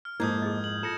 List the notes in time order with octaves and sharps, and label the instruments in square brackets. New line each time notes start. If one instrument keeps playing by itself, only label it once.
[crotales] F6
[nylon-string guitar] F2 G#2 [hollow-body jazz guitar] A#3 A4 [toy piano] E4 [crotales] D#6 G6 G#6
[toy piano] G#4 D#5
[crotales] F#7
[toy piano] F4 [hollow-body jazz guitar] A4 [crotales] A#6 C#7 E7